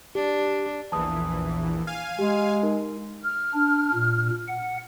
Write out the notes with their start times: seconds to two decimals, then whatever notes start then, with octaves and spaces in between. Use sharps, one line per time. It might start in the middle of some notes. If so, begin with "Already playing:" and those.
0.15 D4 G4
0.92 A#1 E2 E3 A5 D#6
1.87 F5 G#5 F6 D#7
2.19 G#3 G4
2.63 D#4 A#4
3.23 F6
3.53 D4
3.94 A#2
4.48 F#5